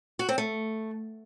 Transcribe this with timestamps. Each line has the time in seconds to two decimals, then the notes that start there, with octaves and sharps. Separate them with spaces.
0.19 F#4
0.29 C4
0.38 A3